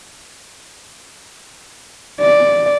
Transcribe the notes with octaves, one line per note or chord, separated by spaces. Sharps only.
D5